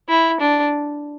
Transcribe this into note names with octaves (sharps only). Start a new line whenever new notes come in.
E4
D4